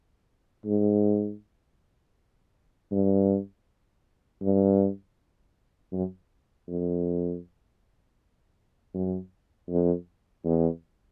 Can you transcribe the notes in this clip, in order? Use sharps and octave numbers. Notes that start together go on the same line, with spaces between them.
G#2
G2
G2
F#2
F2
F#2
F2
E2